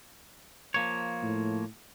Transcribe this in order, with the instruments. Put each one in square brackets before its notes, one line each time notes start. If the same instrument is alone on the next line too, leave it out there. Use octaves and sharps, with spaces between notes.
[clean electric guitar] F3 A#3 C#5
[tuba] A2